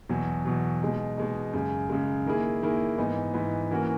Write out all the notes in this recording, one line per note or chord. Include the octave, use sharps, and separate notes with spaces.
E2 B2 F#3
E2 B2 F#3
B2 G#3 D#4
B2 G#3 D#4
F#2 C#3 G#3
F#2 C#3 G#3
D#3 A#3 E4 G#4
D#3 A#3 E4 G#4
G#2 E3 B3 D#4
G#2 E3 B3 D#4
E3 A#3 C#4 F#4 A#4